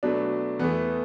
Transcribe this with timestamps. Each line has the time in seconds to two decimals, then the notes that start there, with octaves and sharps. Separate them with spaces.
0.03 B2 F#3 A3 D4
0.59 E2 E3 A3 B3